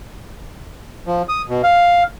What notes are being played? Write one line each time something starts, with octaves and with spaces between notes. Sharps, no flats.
F3
D#6
B2
F5